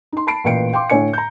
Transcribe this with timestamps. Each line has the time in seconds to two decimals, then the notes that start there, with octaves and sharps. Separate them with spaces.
0.12 D#4 C6
0.27 A5 B5 C7 D7
0.44 A1 A#2 B4 G5 C#7 D7
0.72 F5 G5 C6 D6
0.90 A2 D3 C#5 G#5 C#7
1.13 A#5 G6